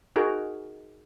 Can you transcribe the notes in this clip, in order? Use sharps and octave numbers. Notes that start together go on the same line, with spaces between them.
D#4 F#4 G#4 A#4